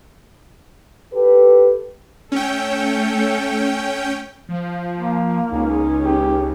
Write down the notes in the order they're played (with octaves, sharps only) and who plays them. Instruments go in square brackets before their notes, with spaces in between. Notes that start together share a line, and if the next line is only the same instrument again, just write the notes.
[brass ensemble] G4 A4 B4
[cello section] A3 A4 [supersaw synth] C#4 G5
[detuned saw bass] F3
[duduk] A#3
[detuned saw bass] C#2 [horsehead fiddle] C#4 D#4
[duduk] G4